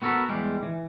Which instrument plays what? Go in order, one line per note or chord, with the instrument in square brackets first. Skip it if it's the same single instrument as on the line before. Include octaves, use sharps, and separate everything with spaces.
[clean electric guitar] B3 F#4 A4 A#4 B5
E2 G3 G#3
E3